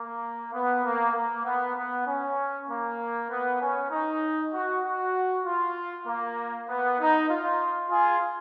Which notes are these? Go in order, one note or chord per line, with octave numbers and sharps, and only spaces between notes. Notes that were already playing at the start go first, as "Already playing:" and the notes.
Already playing: A#3
B3
A#3
A#3
B3
B3
C#4
A#3
B3
C#4
D#4
F#4
F#4
F4
A#3
B3
D#4
F4
F4 G#4